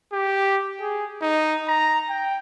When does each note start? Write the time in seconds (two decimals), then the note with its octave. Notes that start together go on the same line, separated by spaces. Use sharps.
0.12 G4
0.80 G#4
1.22 D#4
1.67 A#5
2.09 G5